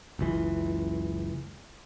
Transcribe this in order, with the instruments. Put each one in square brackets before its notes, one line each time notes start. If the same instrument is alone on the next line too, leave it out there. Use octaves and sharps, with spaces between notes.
[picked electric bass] F#1 C#2 E3